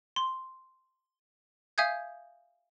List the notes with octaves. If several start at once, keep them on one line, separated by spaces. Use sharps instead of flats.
C6
E5 F5 G#5 D#6 G6 G#6